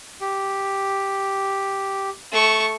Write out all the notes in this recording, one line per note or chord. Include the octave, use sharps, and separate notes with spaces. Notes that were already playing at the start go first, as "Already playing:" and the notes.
G4
A3 C#6